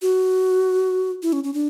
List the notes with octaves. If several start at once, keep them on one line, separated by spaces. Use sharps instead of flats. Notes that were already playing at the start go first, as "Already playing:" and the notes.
F#4
E4
C#4
C#4
D4